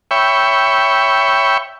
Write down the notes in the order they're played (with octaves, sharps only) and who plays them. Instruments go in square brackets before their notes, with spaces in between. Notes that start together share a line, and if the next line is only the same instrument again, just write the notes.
[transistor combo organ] C#5 E5 G5 B5 C#6